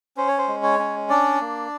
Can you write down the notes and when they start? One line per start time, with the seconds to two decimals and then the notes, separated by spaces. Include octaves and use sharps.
0.17 C#4 C5
0.28 C#5
0.38 C5
0.48 G#3
0.63 C#5
0.79 C#4
1.10 D4 D5
1.41 A#3